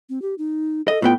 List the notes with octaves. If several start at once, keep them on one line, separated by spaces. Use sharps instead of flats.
C4
G4
D#4
A4 D#5
A2 B3 F4 G5